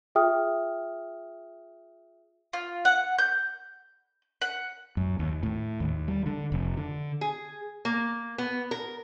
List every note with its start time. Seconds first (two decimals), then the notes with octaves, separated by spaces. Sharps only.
0.15 F4 G#4 E5 G5 D#6 F6
2.53 F4
2.85 F#5
3.18 G6
4.41 F#5
4.97 F#2
5.19 D#2
5.43 A2
5.80 D#2
6.08 G3
6.26 D3
6.52 F1
6.77 D3
7.21 G#4
7.85 A#3
8.38 B3
8.71 A#4